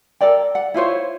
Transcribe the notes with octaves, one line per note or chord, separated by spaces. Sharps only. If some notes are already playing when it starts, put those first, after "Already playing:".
A4 A#4 D5 G5
F#5
E4 F4 C5 C#5